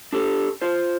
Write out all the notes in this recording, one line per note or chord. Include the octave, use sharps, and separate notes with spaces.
D4 G4 A4
F4 C5